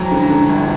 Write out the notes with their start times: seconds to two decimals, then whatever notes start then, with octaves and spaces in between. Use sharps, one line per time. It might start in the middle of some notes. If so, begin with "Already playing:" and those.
Already playing: F2 F#3 A#5
0.11 D3
0.30 D3
0.49 G1